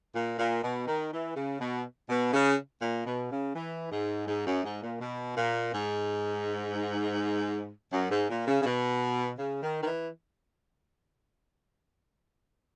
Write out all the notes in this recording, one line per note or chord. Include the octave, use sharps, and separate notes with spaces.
A#2
A#2
B2
D#3
E3
C#3
B2
B2
C#3
A#2
B2
C#3
E3
G#2
G#2
F#2
G#2
A#2
B2
A#2
G#2
F#2
G#2
A#2
C#3
C#3
B2
C#3
D#3
D#3
E3